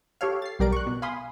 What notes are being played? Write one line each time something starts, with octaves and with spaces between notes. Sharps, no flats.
G4 A4 C#5 F5
A6 C7
B1 G3 G4 A#4 D5 D7
C#6 F#6
B2
F5 G#5 B5 C6 D#6